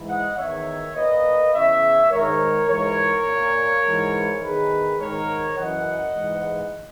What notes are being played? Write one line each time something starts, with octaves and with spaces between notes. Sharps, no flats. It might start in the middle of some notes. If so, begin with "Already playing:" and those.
Already playing: G#2 E3
D#5 F#5
E2 D#3 C#5 E5
A#2 B4 D#5
E2 C#3 E3 C#5 E5
G#2 D#3 A#4 C#5
G#2 E3 A#4 C#5
A#2
G#2 E3
E2 D#3 G#4 B4
G#2 D#3 A#4 C#5
F#2 E3 D#5 F#5
G#2 E3